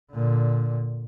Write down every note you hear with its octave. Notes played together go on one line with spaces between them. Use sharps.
A#2 D3